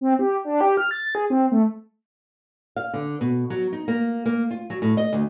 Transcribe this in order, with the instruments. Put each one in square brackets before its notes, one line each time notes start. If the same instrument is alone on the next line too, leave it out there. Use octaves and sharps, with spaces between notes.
[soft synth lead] C4
G4
D4
G4
F6
A6
G#4
C4
A3
[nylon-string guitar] F5
D3
B2
F#3
D#4
A#3
A#3
F4
F#3
A2
D#5
D2